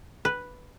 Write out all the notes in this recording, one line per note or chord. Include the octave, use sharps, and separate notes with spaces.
B4